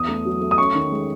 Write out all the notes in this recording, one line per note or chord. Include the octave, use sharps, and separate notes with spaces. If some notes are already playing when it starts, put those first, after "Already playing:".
Already playing: E2 D#6
A3
F#3
A3
D#6
C#4 C#6
D#3
G#3